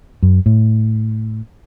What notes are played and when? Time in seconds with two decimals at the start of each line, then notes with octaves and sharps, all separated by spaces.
0.23 F#2
0.46 A2